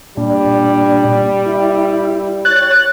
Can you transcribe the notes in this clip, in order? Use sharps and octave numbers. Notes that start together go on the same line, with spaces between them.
A#2 G3 D4
E4
C#5 F#6 A6